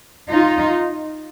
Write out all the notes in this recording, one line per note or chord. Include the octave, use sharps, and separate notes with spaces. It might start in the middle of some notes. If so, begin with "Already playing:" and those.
D#4 F4